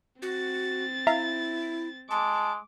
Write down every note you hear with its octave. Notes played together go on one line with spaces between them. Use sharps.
C4 F#4 A6
E4 E5 F5 A#5
G#3 A5 D6